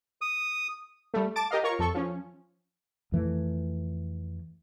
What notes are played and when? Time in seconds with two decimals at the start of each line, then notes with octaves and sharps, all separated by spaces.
0.21 D#6
1.14 G3 A3
1.36 A5 D6 A6 D7
1.51 G4 A#4 D#5 F5
1.63 F4 A#4 C#5 C#6
1.79 F2 A4 C#6
1.95 F3 C#4
3.12 F2 E3 A3